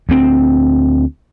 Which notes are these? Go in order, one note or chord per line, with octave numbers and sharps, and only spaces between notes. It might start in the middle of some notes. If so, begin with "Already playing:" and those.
D2 C4